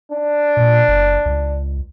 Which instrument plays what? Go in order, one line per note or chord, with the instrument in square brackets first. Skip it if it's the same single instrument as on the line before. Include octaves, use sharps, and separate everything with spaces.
[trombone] D4
[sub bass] A#2
F#1
C#2